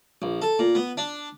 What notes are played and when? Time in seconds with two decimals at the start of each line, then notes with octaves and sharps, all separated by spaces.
0.22 A#1
0.42 A4
0.59 A#2
0.75 B3
0.97 D4